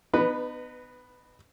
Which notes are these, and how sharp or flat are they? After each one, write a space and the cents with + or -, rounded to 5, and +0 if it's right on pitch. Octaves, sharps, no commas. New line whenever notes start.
B3 +20 D#4 -30 B4 +0